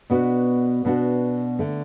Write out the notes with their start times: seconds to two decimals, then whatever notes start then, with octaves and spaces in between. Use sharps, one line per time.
0.10 B2 B3 D4 F#4
0.85 B2 B3 D4 F#4
1.59 D3 A3